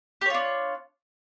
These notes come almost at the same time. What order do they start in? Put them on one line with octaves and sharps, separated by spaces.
G4 C#5 F4 D4